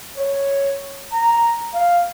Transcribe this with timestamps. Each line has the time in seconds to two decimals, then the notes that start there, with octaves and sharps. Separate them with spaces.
0.17 C#5
1.12 A#5
1.73 F5